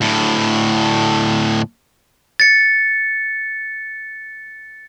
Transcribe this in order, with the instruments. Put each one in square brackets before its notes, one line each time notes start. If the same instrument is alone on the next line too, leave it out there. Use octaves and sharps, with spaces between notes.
[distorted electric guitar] D2 A2
[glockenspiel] A6 C#7